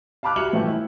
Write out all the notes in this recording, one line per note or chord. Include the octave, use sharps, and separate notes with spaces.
F5 A5 B5 D6 F6 F#6
G3 F#4 E5 C#7 F#7
A2 E3 F3 A3
E4